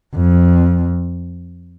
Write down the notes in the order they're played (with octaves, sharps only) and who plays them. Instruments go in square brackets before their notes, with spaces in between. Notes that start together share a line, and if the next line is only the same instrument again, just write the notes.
[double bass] F2